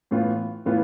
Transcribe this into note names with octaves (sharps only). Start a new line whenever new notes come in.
A2 E3 B3 F4
A2 E3 B3 F4